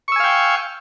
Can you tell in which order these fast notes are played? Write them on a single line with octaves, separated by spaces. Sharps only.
C#6 E6 G#5 F5 G5